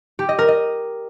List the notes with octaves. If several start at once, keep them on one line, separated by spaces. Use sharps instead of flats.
G4
D#5
A#4
D#5